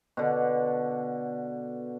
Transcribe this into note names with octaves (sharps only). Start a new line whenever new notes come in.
B2 D3